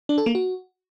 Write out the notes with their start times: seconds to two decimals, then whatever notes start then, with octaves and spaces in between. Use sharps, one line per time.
0.09 D4
0.18 A4
0.26 A#3
0.35 F#4